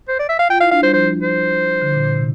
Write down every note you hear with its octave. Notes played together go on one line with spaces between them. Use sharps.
C5
D5
E5
F5
F4 G5
E4 F5
D4 F5
G3 C5
F3 C5
C5
D3
A#2
A#2
C3